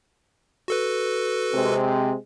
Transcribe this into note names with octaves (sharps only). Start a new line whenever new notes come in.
F#4 A4 B4
C3 G#3 C4